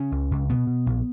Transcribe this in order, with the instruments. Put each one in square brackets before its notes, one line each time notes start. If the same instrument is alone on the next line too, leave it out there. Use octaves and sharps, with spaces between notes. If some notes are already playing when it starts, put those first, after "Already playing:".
Already playing: [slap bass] C#3 C#4
C#2
C#2
B2 B3
B2
A#1